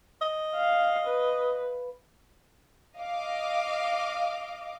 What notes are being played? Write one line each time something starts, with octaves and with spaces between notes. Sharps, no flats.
D#5
F5
B4
D#5 F5 D6